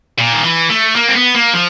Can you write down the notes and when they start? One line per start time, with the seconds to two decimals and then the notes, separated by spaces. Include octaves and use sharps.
0.18 A#2
0.32 D#3
0.44 E3
0.70 A3
0.96 A#3
1.08 C4
1.16 B3
1.35 A#3
1.54 F3